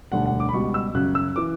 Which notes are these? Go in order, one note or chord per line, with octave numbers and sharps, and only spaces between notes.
E1 D2 D3 G3 F#5
F#5
D6
B5
C#2 B2 G3 C#6
E6
F#2 C#3 F#3 F#6
E6
E3 D6